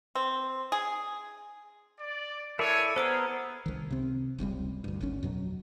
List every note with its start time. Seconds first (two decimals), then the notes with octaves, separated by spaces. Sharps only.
0.15 C4
0.72 G#4
2.00 D5
2.59 D4 E4 A4 A#4 C#5 D5 G#5
2.96 B3 G#4 A#4 C5 E6 D7
3.66 C2 D#3
3.90 C3 C4
4.38 F1 C#2 C3 G3
4.84 D2 G2
5.01 D1 G#1 D2 C#4
5.23 F2 B2 F#3